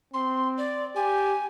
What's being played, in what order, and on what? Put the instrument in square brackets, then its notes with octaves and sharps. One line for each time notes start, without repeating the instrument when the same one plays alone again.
[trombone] C4 [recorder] C6
[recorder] D5
[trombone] G4 [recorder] G#5